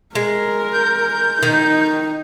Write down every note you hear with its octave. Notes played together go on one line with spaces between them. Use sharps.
G#3 A#4
G6
D#3 D#4